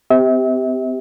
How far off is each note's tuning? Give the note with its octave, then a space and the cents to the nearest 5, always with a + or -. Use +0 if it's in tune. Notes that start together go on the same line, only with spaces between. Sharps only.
C4 -40 G4 +0 E5 -35